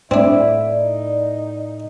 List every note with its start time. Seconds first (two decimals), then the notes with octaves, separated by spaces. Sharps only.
0.11 A2 C4 D4 E4 D5
0.71 D#4